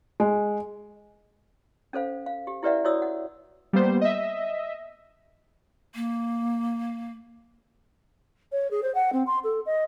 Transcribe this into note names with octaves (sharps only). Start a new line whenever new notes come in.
G#3
C#4 A4 C5 F5
F5
G4
E4 G4 B4 D5 E5 F#5
E4 F#4 C#5 D5 D#6 E6
F#5
G3 A#3 B3 C5
D#5 E5
A#3
C#5
G#4
C5
F#5
C4
C6
A4
D#5